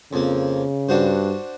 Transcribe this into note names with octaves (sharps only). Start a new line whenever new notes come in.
F2 C#3 A#3
G2 D4 F#4 C5